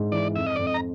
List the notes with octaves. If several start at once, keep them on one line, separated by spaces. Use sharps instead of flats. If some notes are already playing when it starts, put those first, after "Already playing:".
Already playing: G#2 D4
E3 D5
F2 E5
D#5
F2 D5
D#5
A#5